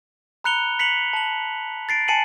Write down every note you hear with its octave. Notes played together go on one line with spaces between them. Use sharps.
A#5 B5 F#6 C#7 F7 G7
B6 C#7 F7 F#7
A5 F#7
A6 C7 D7
G#5 A5 C7 C#7 D#7 F#7